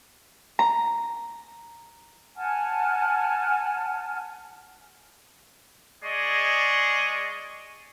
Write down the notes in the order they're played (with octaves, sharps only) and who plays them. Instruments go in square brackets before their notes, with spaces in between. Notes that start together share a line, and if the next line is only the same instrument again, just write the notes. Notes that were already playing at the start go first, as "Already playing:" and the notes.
[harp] A#5
[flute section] F#5 G#5 A5 F6
[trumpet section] G#3 G#4 D5 D#5 C#6